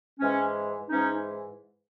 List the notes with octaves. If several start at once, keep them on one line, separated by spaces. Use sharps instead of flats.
G#2 E3 G#3 C#4
G#2 E3 G#3 C#4 D#4